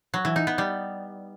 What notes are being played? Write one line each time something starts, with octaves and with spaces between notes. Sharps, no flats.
F#3
E3
D#4
B3
G3